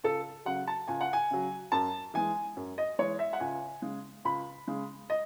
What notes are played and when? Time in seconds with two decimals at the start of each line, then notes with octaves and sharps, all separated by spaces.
0.04 C#2 A4
0.45 C#3 F#3 F#5
0.67 A5
0.88 C#2 G#5
1.01 F#5
1.13 G#5
1.31 C#3 F#3
1.72 F#2 A5
2.14 E3 G#3 G#5
2.57 F#2
2.78 D#5
2.99 E3 G#3 C#5
3.19 E5
3.33 F#5
3.40 C#2 G#5
3.82 C#3 G#3
4.25 C#2 B5
4.68 C#3 G#3
5.10 D#5